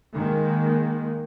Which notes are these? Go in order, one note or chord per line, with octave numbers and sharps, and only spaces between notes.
D#3 G#3 A#3